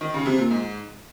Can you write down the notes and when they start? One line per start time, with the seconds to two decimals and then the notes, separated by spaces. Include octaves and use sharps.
0.01 D#3
0.14 C#3
0.26 C3
0.38 A#2
0.51 G#2